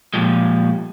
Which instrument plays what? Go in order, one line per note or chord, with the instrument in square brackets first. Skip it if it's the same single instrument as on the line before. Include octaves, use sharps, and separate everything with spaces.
[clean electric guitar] A#2 C#3 F3 G3 G#3